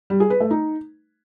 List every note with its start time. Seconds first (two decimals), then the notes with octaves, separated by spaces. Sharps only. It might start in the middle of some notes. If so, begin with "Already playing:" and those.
0.10 G3
0.20 G#4
0.30 B4
0.40 A3
0.51 D#4